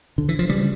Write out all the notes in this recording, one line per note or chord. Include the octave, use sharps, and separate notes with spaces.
D3
E3
F3
C#3 G3